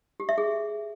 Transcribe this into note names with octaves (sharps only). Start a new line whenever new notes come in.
G4
E5
G#4